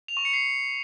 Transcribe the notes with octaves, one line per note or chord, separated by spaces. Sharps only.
F7
C#6
C#7
C7